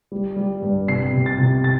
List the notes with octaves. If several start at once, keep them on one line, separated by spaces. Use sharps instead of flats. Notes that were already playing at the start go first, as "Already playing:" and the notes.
G3
G3
G2
C3 C7
C3
A6
C3
A6